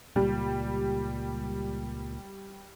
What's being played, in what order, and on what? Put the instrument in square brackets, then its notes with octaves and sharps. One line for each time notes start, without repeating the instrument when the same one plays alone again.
[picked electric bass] C#2 A#2 [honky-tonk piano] G3